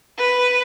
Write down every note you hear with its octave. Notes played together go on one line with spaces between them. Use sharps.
B4